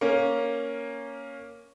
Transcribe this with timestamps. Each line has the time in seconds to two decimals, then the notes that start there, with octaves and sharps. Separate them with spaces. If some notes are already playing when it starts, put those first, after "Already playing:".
0.01 A#3 C#4